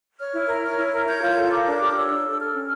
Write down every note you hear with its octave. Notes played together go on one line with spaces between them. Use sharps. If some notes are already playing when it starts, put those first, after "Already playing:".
C#5 F6
E4
A#4
C#5
E4
A#4
C#5 G6
F4
A4
A#4 D6
D4
G4
F6
C#5 E6
D4
A4
A4 F6
C#4